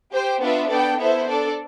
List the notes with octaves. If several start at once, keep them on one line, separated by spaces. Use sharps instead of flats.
G4 C5 G5
B3 D4 F4 B4 E5
B3 D4 A4 D5 G5
B3 E4 A4 C5 E5
D4 A4 D5